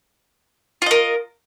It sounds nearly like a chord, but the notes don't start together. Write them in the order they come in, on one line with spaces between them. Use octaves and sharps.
F4 D#5 A#4